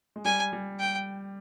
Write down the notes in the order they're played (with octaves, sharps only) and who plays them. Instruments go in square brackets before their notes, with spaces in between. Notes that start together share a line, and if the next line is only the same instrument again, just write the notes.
[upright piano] G#3
[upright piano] G3 [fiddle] G#5
[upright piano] G3
[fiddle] G5